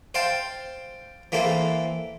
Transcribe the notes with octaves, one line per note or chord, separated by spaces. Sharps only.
C5 F5 G5 A5
E3 A#3 C4 A4